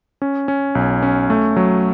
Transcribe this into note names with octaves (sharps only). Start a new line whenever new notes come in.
C#4
C#4
B1
C#4
A3
F#3